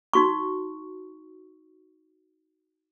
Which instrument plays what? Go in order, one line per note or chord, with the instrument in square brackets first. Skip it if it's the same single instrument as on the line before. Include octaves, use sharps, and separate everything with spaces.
[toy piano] D#4 F#4 C#6